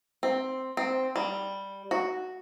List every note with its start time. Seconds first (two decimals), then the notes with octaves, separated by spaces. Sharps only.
0.23 C4
0.77 C4
1.16 G3
1.91 F#4